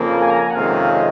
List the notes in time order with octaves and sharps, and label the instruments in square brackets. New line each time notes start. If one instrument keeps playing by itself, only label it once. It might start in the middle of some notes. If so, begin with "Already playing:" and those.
Already playing: [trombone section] F2 C#3 F3 A#3
[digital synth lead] G#5
A#5
G#5
F#5
[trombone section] F2 C3 D#3 G#3 C#4 [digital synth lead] F5
[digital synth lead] D#5